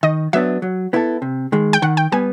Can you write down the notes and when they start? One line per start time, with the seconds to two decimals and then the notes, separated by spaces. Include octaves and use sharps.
0.03 D#3 D#5
0.33 F#3 B3 D4 E5
0.62 F#3
0.93 B3 E4 A4
1.22 C3
1.52 D#3 G#3
1.73 G5
1.82 D#3 F#5
1.97 G5
2.12 G3 B3 G#5